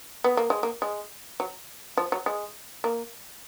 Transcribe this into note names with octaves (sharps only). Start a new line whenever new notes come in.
B3
A#3
G#3
A#3
G#3
F#3
F3
F#3
G#3
A#3